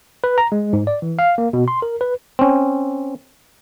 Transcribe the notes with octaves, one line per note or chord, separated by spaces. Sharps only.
B4
A#5
G#3
G#2
D5
E3
F5
A#3
B2
C6
A#4
B4
C4 C#4